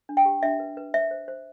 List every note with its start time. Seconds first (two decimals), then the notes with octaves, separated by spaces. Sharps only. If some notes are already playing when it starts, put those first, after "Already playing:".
0.09 D4
0.17 G5
0.25 G4
0.43 D4 E5
0.60 B4
0.77 B4
0.94 C5 E5
1.11 C5
1.28 C5